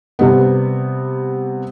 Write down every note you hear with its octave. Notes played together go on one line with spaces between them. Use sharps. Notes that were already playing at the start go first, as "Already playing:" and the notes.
C3 G3 B3